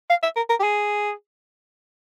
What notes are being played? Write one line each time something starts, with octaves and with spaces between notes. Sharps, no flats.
F5
E5
A#4
A#4
G4
G#4